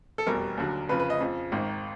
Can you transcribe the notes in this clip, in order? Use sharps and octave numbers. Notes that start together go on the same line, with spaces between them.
A4
F1 E2 B2 G3 A#4
D#2 D3 F#3
F2 C#3 F3 B4
B4
D#5
F2 C#3 F3
G#1 G#2 D#3